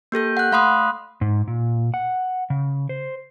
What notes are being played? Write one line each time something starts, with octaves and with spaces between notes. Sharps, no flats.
A#3 G4 A4 G6
F#5 F#6
A3 F5 B5 C6 D#6 F#6
G#2
A#2
F#5
C#3
C5